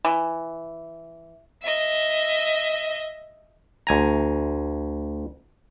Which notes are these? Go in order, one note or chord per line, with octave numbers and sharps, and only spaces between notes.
E3
D#5 E5
D2 G#5 A#5